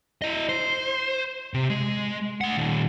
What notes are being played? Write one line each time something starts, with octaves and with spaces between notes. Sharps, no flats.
E4 D#5
C5
C3
G#3
A3 F#5
A#2 D#3